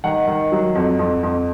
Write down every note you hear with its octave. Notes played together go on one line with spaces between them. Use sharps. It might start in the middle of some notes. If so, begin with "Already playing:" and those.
D#3 F#5
D#3
F#3
F2
F2
F2